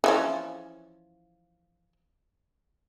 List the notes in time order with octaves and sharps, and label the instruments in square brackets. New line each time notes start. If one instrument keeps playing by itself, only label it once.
[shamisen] E3 F3 C#4